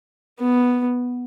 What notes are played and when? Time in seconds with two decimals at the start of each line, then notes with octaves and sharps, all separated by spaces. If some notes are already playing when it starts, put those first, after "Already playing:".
0.39 B3